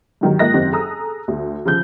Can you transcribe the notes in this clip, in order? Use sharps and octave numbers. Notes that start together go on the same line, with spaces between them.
G2 D#3 F#3
G#2 A#3 F4 D#5 F#6 A#6
F#1 D#3 C4 G4
G#4 A4 A#5 D#6 E6
D2
C#3 F3 G6